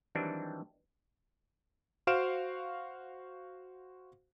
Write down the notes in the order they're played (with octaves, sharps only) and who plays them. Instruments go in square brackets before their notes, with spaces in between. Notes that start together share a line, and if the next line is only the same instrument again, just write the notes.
[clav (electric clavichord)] D#3 E3 F#3 G3 C4 D4
[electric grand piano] F#4 C5 F5 F6 D7 E7